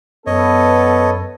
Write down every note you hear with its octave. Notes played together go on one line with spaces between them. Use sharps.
F#2 B3 A4 B4 C#5 D#5